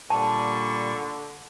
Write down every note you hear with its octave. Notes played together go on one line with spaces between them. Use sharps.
A#2 D3 G3 A5 C#6